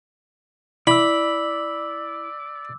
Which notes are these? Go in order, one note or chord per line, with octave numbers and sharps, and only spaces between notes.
E4 D5 B5 D6 E6